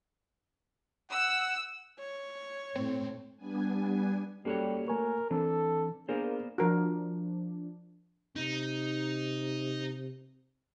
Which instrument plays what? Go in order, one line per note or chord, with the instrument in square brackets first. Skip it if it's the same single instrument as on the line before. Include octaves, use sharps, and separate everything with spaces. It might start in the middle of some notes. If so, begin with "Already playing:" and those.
[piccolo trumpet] F#5 [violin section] E6
[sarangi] C#5
[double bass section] A2 [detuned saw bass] C4
[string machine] G3 B3 D4 G#5
[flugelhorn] G3 [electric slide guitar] A#3 F#4 C#5 [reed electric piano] C#4 G4 A4
[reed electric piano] A3 G#5 C#6 [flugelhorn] A#4
[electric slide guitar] E3 [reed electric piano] C4 D4 [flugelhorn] A4
[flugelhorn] A#3 [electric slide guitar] B3 A#4 C5 [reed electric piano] D4 G#4 D5
[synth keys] F3 D4 [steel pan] F#4 A#4
[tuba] C3 [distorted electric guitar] D#4